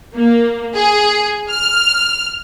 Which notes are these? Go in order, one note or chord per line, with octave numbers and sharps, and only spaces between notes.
A#3
G#4
F6